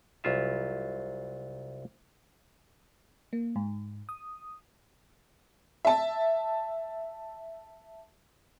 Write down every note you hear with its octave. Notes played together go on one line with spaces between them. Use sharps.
C2 F#3 F4 E5
A#3
G#2
D#6
E5 A5